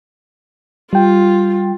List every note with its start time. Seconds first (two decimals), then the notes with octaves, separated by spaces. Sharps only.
0.93 G3 F4 G5